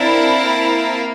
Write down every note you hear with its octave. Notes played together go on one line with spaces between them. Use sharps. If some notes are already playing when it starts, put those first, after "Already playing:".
Already playing: C4 D4 E4 A#4 F5 A5
A#3